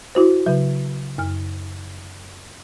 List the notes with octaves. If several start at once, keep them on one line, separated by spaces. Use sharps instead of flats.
E4 F#4 C5
C#3 F#3
F#2 F6